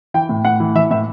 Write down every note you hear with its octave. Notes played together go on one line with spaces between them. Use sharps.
E3 G5
A2
A2 F#5
E3
E3 E5
A2 E5